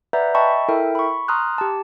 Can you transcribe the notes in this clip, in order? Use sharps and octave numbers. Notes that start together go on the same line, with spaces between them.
B4 D5 E5 F#5 A#5 G6
D#5 E5 G5 A5 B5 C#6
E4 A4 A#4 E5 G5
B5 C#6
A#5 C6 D#6 F6 F#6
G4 A5